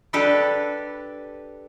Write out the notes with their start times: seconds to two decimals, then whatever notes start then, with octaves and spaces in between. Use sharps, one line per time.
0.13 D4 G4 A4 B4 D5